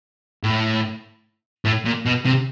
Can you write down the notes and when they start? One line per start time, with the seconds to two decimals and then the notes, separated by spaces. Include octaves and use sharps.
0.43 A2
1.65 A2
1.85 A#2
2.06 B2
2.25 C3